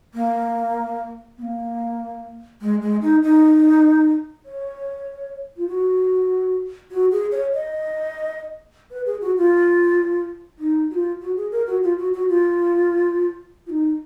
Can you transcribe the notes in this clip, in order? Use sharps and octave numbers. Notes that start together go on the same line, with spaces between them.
A#3
B3
A#3
G#3
G#3
D#4
D#4
C#5
F4
F#4
F#4
G#4
C#5
D#5
B4
G#4
F#4
F4
D#4
F#4
F4
F#4
G#4
A#4
F#4
F4
F#4
F#4
F4
F4
D#4